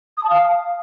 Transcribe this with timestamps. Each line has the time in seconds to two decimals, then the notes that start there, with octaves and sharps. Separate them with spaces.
0.17 D#6
0.23 A5
0.30 F5